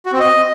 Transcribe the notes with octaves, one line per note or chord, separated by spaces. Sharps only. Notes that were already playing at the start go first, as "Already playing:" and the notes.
F#4
C4
D#5